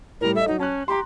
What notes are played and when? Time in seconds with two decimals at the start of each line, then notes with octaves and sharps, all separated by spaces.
0.21 A2 G3 A#4
0.35 A4 D#5 E5
0.48 F#3 D#4
0.59 C#4 A5 F#6
0.88 G4 A#5 C6